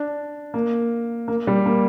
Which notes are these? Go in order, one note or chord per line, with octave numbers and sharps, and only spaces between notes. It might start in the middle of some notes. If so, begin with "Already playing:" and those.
Already playing: D4
A#3
A#3
G3
A#3